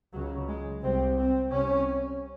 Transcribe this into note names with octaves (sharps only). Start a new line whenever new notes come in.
C#2 C#3 F#3
G#3
C2 C3 C4
C4
C2 C3 C#4